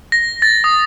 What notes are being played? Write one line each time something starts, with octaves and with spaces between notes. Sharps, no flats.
A#6
A6
D#6